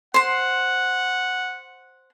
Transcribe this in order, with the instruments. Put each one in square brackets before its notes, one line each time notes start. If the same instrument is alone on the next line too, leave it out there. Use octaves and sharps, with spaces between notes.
[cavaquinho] C5 C6 [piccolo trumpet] F#5